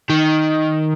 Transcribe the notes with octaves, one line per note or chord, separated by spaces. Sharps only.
D#3